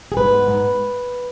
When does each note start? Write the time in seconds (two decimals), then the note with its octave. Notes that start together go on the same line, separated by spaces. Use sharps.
0.12 G#4
0.17 G#2 B4
0.33 B3
0.47 G#2